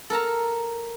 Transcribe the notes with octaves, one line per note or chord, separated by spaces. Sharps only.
A4 A#4 A5 A#5